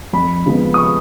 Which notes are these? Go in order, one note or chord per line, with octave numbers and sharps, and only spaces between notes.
F2 B5
C#3 F3 G#3 B3
D#6
C#6